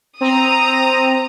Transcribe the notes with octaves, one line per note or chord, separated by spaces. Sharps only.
C4 A#5 D#6